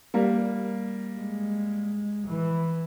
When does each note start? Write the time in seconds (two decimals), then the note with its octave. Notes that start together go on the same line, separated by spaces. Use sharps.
0.14 G3 A#3
1.17 G#3
2.27 E3